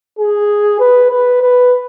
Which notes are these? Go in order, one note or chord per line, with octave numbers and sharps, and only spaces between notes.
G#4
B4
B4
B4